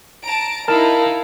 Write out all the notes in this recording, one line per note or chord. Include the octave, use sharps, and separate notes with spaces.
A5 A#5 D7
D#4 E4 A#4 F5 A5